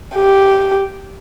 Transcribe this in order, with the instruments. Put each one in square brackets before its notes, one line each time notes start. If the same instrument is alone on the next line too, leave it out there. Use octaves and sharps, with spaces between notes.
[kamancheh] G4